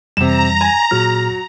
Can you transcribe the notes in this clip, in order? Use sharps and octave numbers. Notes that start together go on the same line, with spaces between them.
F2 C3 E3 G3 A#5 E7
G#5
A#2 F#3 G#4 F6